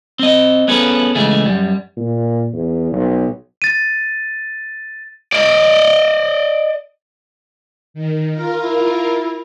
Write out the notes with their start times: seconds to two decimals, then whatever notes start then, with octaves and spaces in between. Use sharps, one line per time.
0.19 C4 D#5
0.68 B3 C#4 G#4 A4 B4
1.15 C#3 E3 G#3 A3 G#4
1.45 F#2 G3
1.97 A#2
2.53 E2
2.92 B1
3.62 A6 D#7
5.33 D5 D#5
7.94 D#3
8.32 F4 A#4
8.62 E4